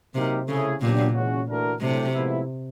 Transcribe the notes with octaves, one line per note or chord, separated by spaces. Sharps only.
C3 F#3 A#3 D#4 G4 A#4
C#3 A3 C#4 E4 G#4
A#2 F#3 B3 D4 G4
E3 G#3 C#4 F#4
E3 A3 D4 F#4 A#4
A2 C3 F#3 A3 D4 G4
A2 F3 G#3 B3 E4